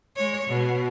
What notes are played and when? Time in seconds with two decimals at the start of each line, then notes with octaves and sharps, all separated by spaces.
0.16 G#3 C#5
0.47 B2